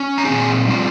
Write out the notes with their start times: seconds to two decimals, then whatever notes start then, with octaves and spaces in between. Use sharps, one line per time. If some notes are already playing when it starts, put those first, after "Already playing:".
Already playing: C#4
0.18 A#5
0.25 A#2 F3 C4 D#4 G#4 G#5
0.67 G3 C4 F4